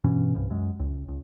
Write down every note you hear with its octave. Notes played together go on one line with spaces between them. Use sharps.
G2 B2 E3 C#4
C2 G2
F#2 G#3
C#2
C#2